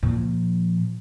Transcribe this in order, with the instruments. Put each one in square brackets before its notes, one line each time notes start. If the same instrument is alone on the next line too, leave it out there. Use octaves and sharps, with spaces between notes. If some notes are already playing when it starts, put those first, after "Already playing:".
[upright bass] A#2 F3